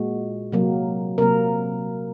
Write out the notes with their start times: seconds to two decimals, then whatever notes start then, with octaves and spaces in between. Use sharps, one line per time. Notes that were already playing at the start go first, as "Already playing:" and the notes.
Already playing: A#2 G#3 F#4
0.52 C3 F#3 A#3
1.18 C3 F#3 A#3 A#4